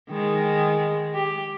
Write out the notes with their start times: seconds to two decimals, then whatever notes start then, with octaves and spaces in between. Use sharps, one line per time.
0.10 D#3 G#3
1.15 G4